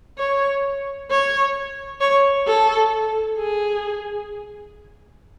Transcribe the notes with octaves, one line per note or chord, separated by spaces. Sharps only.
C#5
C#5
C#5
A4
G#4